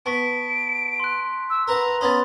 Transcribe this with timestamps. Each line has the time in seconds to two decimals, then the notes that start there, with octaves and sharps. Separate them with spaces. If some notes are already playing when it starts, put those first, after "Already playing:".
0.06 B3 A5 C#6 B6 D7
1.00 C6 F#6
1.50 E6
1.68 A#4 B4 F#5 A#5
2.01 B3 C#4 D#5 B5 C6 A6